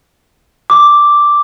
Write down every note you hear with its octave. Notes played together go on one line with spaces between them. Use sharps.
D6